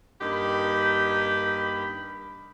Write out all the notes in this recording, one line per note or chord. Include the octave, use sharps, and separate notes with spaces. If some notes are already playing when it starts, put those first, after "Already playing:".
G2 A#3 D#4 G4 B5